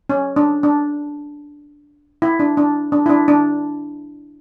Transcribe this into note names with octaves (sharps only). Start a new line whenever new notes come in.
C#4
D4
D4
E4
D4
D4
D4
E4
D4
D4